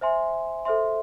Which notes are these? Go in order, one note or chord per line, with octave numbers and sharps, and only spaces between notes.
C5 E5 G#5 C6
A4 C5 E5 C6